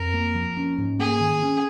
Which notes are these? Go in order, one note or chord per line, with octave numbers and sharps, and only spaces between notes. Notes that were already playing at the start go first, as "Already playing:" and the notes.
Already playing: F2 A#4
A#3
F3
C#4
G#2
A#3 G#4
D#3
C#4